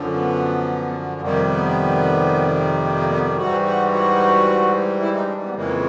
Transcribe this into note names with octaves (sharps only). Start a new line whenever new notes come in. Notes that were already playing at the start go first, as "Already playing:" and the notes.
Already playing: F#2 D3 F3
B3
F2 C3 D#3 G3 A#3
B3
A#3
A#3
B3
D4
G#2 E3 G3 F#4
F#4
F#4
E4
D#4
D4
B3
F2 C#3 E3 G#3 A#3